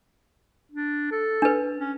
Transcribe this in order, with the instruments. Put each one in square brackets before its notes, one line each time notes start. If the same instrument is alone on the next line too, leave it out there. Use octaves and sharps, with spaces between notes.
[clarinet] D4
A4
[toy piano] D4 B4
[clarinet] C#4